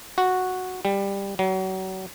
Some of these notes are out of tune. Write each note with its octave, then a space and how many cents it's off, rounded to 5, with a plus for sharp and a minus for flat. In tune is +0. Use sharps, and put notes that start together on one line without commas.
F#4 -5
G3 +15
F#3 +35